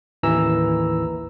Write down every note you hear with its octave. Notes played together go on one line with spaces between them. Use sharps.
A1 D#2 E3 A#5 E6